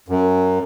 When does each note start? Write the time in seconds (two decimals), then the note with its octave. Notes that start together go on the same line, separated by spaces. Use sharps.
0.08 F#2